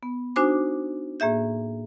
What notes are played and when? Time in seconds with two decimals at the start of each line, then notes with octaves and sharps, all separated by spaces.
0.03 B3
0.36 D4 D#4 F#4 C5 G#5 D6
1.20 A2 A#3 G#4 E5 G6